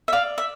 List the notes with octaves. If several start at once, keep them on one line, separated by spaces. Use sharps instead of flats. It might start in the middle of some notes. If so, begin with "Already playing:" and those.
E5
D5 F5
E5